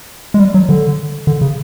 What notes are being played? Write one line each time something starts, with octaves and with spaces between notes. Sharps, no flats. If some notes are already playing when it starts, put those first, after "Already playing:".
G#3
G3
F#3
D3
D3
C#3